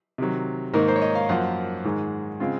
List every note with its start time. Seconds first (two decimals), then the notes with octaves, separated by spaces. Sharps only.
0.18 C3 D#3 F#3
0.74 G#2 D#3 A#3 D#4 A#4
0.88 C5
0.96 C#5
1.01 D#5
1.15 F5
1.29 F#2 F3 A#3 F4 F#5
1.84 G#2 D#3 G#3
2.40 C#3 G#3 C4 F4